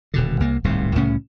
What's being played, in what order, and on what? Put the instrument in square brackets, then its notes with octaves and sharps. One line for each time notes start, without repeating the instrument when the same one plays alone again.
[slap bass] D#1 B2 D3
C2 A#3
D1 C2 G#2 C3
C2 A2 C#3 C#4